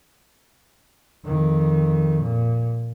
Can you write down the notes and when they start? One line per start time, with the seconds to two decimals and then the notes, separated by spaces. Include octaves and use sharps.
1.25 F2 D#3
2.21 A#2